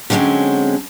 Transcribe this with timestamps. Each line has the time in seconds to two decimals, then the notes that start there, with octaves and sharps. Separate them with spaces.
0.10 D3 F#3 G#3 A#3 C4 C#4